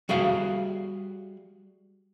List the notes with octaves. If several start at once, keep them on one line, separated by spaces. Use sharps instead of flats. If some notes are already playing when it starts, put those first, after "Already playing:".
G3 F#4 G#4 E5 F5